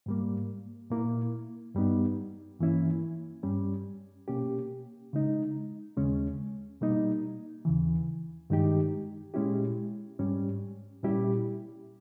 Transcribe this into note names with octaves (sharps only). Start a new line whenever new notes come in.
G#2 G3 A#3
A#2 A#3 E4
G2 G3 B3 D#4
G2 E3 A#3 C#4 E4
G2 G3 C#4
B2 A#3 C#4 G4
C#3 G#3 D#4
D#2 C#3 G#3 C#4
B2 G3 A#3 D#4
D#2 C#3 E3
G2 D#3 G#3 D#4 G4
A#2 G#3 C#4 E4 G4
G#2 G3 C#4 G4
A#2 G3 C#4 E4 G4